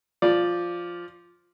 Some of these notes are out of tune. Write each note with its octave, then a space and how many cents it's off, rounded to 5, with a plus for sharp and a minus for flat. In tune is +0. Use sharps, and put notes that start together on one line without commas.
F3 +0 D5 +0